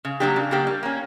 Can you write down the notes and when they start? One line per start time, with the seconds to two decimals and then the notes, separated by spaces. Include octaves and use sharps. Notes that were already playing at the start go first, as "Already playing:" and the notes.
0.05 C#3
0.20 F#3 A#3 D4 G4
0.36 C#3
0.51 F#3 A#3 D4 G4
0.67 G3
0.83 A#3 C#4